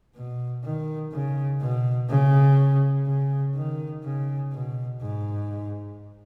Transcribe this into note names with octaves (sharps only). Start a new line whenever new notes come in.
B2
D#3
C#3
B2
C#3
C#3
D#3
C#3
B2
G#2